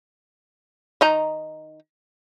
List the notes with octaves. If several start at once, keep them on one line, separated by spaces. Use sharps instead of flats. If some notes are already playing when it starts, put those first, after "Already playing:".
D#3 D#4 A#5